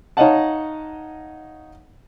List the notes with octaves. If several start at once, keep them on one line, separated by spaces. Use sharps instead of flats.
D#4 C#5 D#5 F5 F#5 A5